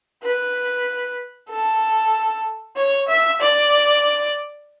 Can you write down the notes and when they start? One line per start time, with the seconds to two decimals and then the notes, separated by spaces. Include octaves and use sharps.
0.23 B4
1.50 A4
2.76 C#5
3.08 E5
3.40 D5